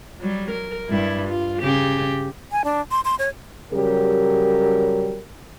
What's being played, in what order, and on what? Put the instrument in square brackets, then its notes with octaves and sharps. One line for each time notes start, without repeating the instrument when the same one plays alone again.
[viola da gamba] F#3 G3
A#4
G2 G3 E4
F4
C#3 G4
[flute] G#5
D4
C6
C6
C#5
[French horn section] C#3 F#3 G3 G4 A#4